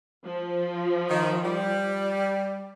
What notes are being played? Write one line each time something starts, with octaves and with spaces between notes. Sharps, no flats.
F3
D#3
G3